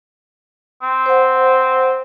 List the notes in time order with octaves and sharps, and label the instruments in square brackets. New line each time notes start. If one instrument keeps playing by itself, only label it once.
[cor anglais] C4
[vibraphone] C5 F#5